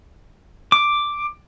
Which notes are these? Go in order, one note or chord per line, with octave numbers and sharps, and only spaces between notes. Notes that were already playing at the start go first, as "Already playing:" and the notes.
D6